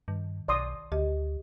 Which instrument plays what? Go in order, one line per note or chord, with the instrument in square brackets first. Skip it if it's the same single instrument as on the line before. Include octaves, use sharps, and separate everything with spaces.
[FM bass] G2 [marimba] D#3
[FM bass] B1 [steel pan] D5 C6 D#6
[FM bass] D2 [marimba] G4 D#5